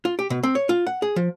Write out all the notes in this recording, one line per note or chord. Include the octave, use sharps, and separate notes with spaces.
F4
G4
B2
C4
C#5
F4
F#5
G#4
F3